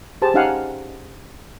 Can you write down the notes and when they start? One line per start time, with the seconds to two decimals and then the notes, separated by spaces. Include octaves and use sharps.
0.22 G4 G#4 C5 A5
0.34 C#4 D#4 G4 F5 F#5 G#5